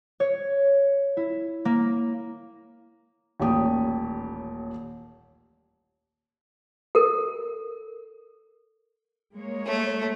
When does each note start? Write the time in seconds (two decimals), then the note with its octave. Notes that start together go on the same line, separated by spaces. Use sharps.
0.20 C#5
1.17 E4
1.65 A#3
3.40 D#1 A1 A#2 G4 D#6
6.95 A4 A#4
9.33 G#3 A#3 C#5
9.66 A3